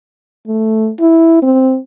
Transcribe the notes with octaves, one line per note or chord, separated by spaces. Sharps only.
A3
E4
C4